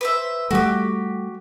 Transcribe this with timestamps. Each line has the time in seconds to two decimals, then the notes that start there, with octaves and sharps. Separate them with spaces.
0.01 B4 C5 E5
0.51 G3 A3 F#4 G4